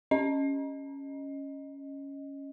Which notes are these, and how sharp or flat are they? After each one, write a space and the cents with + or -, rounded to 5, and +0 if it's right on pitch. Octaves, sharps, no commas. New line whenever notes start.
C#4 +0 D#5 +0